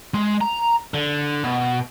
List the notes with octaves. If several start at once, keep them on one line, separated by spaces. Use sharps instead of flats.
G#3
A#5
D3
B2